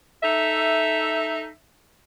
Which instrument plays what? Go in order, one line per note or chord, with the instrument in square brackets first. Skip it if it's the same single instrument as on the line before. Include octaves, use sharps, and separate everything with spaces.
[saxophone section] D#4 A4 E5